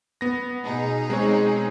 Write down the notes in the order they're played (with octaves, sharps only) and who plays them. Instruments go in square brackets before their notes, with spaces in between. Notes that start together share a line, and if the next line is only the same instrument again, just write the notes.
[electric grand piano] B3 A#6
[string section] B2 D#4 G#4
[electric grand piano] G#3 C4 C#5